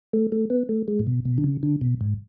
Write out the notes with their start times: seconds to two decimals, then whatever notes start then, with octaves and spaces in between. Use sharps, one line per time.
0.13 A3
0.32 A3
0.50 B3
0.69 A3
0.88 G#3
0.99 A2
1.07 B2
1.25 B2
1.38 D3
1.44 C#3
1.63 D3
1.81 B2
2.01 G#2